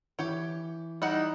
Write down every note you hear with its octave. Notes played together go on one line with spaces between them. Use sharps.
E3 G4 C#5 G5
G3 D#4 E4 F#5